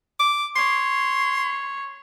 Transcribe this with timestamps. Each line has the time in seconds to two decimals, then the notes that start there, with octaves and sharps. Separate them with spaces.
0.20 D6
0.56 C#5 C6